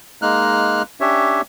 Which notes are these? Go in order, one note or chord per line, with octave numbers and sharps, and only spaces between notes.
G#3 A#3 D#4 F6 F#6
C#4 D4 G4 C#5 E5